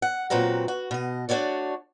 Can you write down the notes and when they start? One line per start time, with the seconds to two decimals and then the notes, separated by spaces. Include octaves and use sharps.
0.02 F#5
0.30 A#2 F#3 C4 B4 A#5
0.68 F#4
0.91 B2 D#5
1.29 A3 D4 F#4 C#5 D5